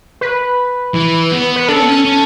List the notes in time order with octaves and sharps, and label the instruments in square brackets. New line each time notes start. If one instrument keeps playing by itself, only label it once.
[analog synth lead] B4
[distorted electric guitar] E3
B3
[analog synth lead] B4
[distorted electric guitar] D4 [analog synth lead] A4
[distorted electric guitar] C#4
B3
C#4
C#4